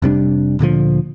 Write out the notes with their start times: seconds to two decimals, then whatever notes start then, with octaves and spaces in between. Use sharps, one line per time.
0.02 F1 C3 G3 D4
0.59 D2 A#2 D3 F3